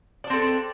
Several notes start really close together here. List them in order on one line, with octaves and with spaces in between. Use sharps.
D5 D4 C4 A4